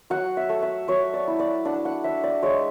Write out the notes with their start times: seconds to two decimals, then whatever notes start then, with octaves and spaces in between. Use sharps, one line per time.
0.10 F#3 F#5
0.37 E5
0.49 A3
0.62 E5
0.88 F#3 C#5
1.13 D5
1.27 E4
1.39 D5
1.65 D4 F#5
1.85 F#5
2.04 D4 E5
2.24 D5
2.43 G#3 C#5